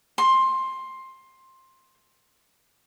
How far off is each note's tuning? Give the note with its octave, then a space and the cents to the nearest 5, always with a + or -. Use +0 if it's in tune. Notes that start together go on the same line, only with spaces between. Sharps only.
C6 +15